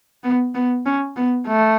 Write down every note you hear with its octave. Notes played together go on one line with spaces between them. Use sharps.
B3
B3
C#4
B3
A3